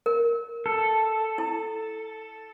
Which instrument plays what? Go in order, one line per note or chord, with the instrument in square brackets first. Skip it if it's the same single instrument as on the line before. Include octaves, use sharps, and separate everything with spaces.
[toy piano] A#4
[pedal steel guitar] A4
[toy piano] E4